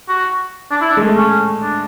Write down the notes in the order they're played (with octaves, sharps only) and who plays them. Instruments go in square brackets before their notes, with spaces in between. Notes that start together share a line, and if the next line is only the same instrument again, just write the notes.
[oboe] F#4
D4
E4
D4
[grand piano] G#3
A3
[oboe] C#4
D4